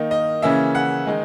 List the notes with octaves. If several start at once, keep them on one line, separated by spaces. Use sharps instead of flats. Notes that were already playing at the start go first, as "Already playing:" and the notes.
Already playing: D#3 A#3 D#4
D#5
C#3 E3 A#3 C#4 E5
F#5
D#3 G#3 D#4